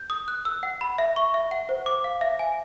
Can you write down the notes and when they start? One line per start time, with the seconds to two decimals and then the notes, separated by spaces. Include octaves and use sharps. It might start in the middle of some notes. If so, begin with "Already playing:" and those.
Already playing: G6
0.10 D#6
0.28 F#6
0.45 E6
0.63 F#5
0.81 B5
0.98 E5
1.16 C#6
1.34 E5
1.51 F#5
1.69 C5
1.86 D6
2.04 F5
2.21 E5
2.39 G#5